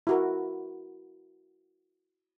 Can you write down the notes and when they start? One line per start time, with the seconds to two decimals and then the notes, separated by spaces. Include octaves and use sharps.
0.07 E4 F#4 A#4